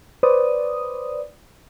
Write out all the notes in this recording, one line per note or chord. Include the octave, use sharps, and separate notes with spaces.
B4 C5 D5 D#6